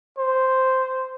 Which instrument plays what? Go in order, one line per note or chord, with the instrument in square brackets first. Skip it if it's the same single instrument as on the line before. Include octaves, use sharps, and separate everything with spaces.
[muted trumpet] C5